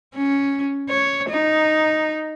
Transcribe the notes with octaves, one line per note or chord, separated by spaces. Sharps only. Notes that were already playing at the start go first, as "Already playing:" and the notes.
C#4
C#5
D#4